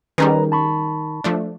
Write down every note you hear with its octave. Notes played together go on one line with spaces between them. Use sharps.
D#3 G3 C#4 G#4 B4 A#5
A5 B5 C#6
F3 A3 D4